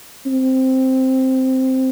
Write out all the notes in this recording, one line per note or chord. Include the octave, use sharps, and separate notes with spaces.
C4